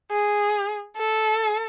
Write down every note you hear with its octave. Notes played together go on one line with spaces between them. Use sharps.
G#4
A4